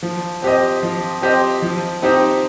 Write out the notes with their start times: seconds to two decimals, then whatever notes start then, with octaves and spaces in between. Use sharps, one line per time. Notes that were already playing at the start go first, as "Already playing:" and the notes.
0.03 F3
0.42 C4 G4 C5 D#5
0.83 F3
1.22 C4 G4 C5 D#5
1.62 F3
2.02 C4 D#4 G4 C5